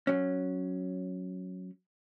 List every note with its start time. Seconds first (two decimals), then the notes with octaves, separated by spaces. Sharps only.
0.07 F#3 C#4